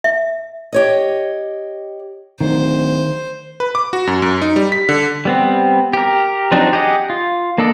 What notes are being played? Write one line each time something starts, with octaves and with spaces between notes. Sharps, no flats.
E5
G4 C#5 D#5
D1 D#3 C5
B4
D6
F#4
F#2
F#2
D#4
G3
B6
D3
G3 B3 C4
G4 A#4
F3 F#3 C4 D4 D#4
G4 G#4 D#5 F#5
F4
A#3 D4 A4 D5 D#5